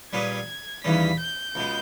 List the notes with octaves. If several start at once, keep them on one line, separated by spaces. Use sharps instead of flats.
A#2 G3 C#4 G#4 B4 G#6
D#2 C#3 E3 G3 C#4 B6
G6
C#2 B2 G#3